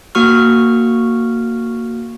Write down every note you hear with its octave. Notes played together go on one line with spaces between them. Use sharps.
A#3 F#4 C#6 F6